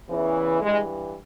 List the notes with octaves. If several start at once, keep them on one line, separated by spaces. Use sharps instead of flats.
E2 C#3 E3
G2 E3 G#3